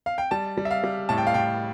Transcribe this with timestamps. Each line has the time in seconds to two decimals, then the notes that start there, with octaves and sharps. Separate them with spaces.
0.06 F5
0.18 G5
0.31 G3 A5
0.57 G3
0.65 E5
0.71 F5
0.84 G3
1.09 A2 A5
1.18 G5
1.27 F5
1.34 A2 G5